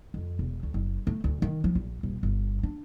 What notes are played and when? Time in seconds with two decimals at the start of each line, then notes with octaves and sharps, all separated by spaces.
0.14 F2
0.39 E1
0.63 D2
0.74 F#1
1.07 A3
1.24 D2
1.42 D#3
1.64 F3
1.75 A#1
2.03 D#1
2.23 G1
2.63 D4